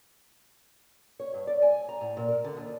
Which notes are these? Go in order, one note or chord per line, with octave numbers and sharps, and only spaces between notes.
C#5
G2
D5
G#5
A#5
A2
A#2
A#4
D3
D#2